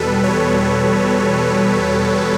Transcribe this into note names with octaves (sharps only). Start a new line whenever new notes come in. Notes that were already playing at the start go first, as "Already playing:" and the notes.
Already playing: E2 B2 G3 A4 B4
C#5